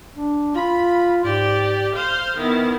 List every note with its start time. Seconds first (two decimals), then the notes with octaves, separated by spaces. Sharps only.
0.14 D4
0.55 F4 B5
1.24 G#2 G4 D5
1.95 C5 F5
2.37 D#3 B3 E4